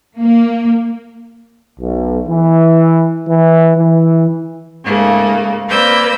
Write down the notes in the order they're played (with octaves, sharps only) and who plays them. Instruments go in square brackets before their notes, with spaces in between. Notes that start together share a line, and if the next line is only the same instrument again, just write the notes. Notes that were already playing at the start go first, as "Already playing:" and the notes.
[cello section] A#3
[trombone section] B1
E3
E3
E3
[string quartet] G#2 C#3 A3 A#3
A#3 C4 B4 D5 E6 G6